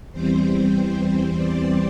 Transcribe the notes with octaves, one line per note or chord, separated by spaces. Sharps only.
E2 E3 G3 C4 C5
C5
D5